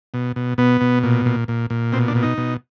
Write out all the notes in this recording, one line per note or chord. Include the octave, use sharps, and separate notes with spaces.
B2
B2
B2 B3
B2
A#2
A#2
A#2
A#2
B2 C4
D4
B2
D#4
B2